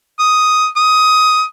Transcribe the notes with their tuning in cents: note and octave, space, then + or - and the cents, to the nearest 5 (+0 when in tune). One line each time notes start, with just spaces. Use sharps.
D#6 +5
D#6 +15